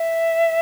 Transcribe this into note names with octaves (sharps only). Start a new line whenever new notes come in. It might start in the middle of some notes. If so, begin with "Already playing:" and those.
Already playing: E5